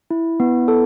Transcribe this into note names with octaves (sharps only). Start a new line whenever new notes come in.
E4
B3
A4